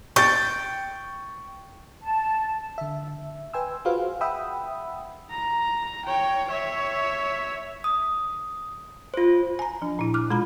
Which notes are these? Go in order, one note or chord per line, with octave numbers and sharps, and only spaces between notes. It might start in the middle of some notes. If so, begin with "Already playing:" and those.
G5 C#6 A6
A5
D3 E5
B4 G5 G#5 C6 E6
F4 F#4 G#4 B4 C5 F5
E5 F#5 G5 B5 D#6 E6
A#5
C#5 G5
C#5 E5
D#6
F4 C5
G#5 A#5
F3 D4
A#2 E4
D6 F6 F#6
B2 G#3 F4 G#4 A#5 B5